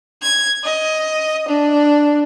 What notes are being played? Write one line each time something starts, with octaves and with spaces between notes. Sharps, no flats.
G#6
D#5
D4